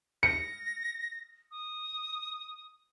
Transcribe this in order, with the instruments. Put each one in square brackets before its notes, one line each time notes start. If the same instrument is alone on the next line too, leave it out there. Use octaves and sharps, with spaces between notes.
[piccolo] A#6 [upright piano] C#7
[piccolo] D#6